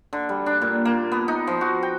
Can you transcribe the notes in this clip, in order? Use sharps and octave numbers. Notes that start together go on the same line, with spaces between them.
D3
G3
D4
A#2
A#3
B3
D#4
F3
F#4
G5